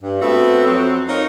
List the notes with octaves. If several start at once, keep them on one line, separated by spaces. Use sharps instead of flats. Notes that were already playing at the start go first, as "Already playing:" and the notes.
G2
A3 B3 C4 F#4 E5
F2 F#3 C4
D#4 F4 A#4 C#5